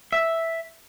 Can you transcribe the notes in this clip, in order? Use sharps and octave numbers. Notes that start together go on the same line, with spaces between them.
E5